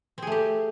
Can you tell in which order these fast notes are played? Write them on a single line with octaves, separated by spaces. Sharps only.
C4 G#4 A3 G4